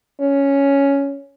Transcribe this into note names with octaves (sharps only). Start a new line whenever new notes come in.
C#4